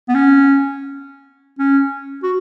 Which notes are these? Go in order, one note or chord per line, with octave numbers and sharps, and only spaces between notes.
B3
C#4
C#4
F#4